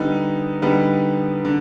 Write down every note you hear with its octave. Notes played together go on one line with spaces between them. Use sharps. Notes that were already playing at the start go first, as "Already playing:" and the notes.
Already playing: D3 G3 B3 D#4
D3 G3 B3 D#4
D3